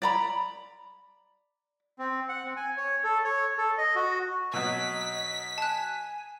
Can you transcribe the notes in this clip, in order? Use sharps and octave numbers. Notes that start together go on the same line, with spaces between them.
D5 A#5 B5
C4
F#5
C4
G#5
C#5
A4
C#5
A4
D#5
F#4
B2 F#3 D#5 B6
G#5 A5 F#6